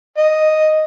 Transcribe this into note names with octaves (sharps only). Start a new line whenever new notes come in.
D#5